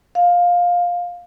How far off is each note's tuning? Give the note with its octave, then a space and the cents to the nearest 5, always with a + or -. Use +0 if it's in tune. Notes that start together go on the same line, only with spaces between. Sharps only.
F5 +15